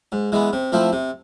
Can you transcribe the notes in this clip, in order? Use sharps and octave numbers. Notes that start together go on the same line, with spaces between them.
G#2
E3 G#3 B3
C3
F3 A3 C4 E4
C3